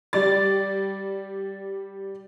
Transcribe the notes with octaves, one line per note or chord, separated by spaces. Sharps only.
G3 D5 A6